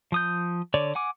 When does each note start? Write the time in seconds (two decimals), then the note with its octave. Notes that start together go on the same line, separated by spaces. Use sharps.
0.12 F3 D#6 G6
0.74 D3 C#5 D5
0.95 F#5 G#5 D6